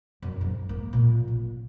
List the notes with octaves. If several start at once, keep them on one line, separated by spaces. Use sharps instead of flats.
F#2
G#2
A#3
A#2
A1